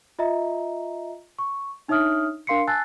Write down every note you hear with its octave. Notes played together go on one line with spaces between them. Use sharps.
F4 D#5 E5 A#5
C#6
D4 D#4 C#5 E5 D#6 F6
D4 A#4 F5 C6 C7 C#7
G#5 A5 E6 F#6 A6 C7